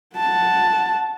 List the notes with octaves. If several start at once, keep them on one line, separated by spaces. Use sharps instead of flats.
F#5 A5